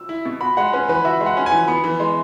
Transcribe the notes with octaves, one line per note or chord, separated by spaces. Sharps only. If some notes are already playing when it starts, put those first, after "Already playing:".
Already playing: E6
E4
B2
F#4 B5
G#3 F#5
C#4 B4
E3 B4
F#4 E5
G#3
F#5
C#4
G#5
E3
B3 B5
E3
G#3